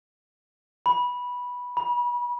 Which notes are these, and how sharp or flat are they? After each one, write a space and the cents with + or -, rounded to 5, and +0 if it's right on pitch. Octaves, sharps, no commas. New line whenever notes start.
B5 -10
B5 -30